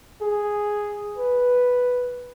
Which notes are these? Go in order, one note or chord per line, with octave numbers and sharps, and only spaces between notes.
G#4
B4